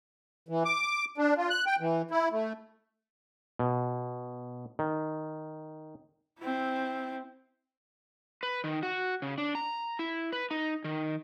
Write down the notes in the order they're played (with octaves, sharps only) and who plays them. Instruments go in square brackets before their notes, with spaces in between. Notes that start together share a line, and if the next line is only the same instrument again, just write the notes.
[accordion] E3
D6
D4
F4
F#6
G5
E3
E4
A3
[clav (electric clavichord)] B2
D#3
[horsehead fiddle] C4 E4
[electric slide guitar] B4
D#3
F#4
C#3
D4
A#5
E4
B4
D#4
D#3